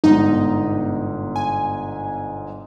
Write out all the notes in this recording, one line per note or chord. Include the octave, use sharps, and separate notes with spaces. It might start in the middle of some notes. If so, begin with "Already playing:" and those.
G1 G#2 B2 D#4
G#5